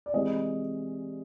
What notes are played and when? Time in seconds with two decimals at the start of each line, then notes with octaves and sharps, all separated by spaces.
0.06 D5
0.13 C3 E3 G#3 D#5